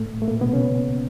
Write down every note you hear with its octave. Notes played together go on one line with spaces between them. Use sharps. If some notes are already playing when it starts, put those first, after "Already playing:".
Already playing: A2 A3
A3
A#2 A#3
B2 B3
C#3 C#4